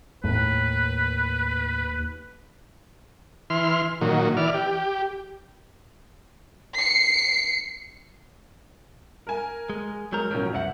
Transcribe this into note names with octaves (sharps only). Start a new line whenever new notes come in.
D#2 A2 B4
E3 C6 F6
A#2 D#3 F#3
E3 D5 F6
G4
C7 C#7
A#4 G#5
G#3
F#3 G#3 A#4 G6
A1 B2 F3 F#3 C#4 A#4
C2 F#2 E5 F#5 C#7